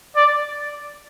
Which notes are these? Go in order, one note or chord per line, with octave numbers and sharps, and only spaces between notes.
D5